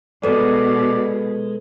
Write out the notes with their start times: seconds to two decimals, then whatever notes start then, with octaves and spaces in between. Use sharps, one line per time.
0.24 B2 G#3 A4 B4 D5